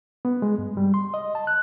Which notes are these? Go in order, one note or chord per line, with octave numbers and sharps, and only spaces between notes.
B3
G#3
G2
G3
C6
D#5
A5
F#6